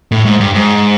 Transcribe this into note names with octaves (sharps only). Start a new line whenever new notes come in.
A2
G#2
G2
G#2